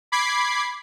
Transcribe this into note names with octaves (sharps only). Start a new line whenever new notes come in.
B5 D6 G#6 C7